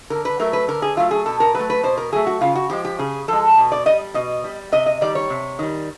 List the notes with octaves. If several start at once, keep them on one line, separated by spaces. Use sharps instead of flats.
D3 A#4
B4
F#3 A3 A#4
B4
D3 A#4
G#4
F#3 A3 F4
G#4
B2 A4
A#4
F#3 A3 B4
B4
B2 C5
A#4
F#3 A3 G#4
F#4
C#3 F4
F#4
F3 G#3 G4
G4
C#3 G#4
F3 G#3 A4
B2
D5
G3 D#5
B2 D#5
G3
C3 D#5
D#5
D#3 G3 D5
C#5
C3
D#3 G3